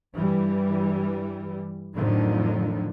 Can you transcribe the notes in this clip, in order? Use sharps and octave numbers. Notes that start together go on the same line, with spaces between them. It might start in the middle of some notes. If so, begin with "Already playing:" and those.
G2 E3 G3
F2 A2 D3 D#3 F3 F#3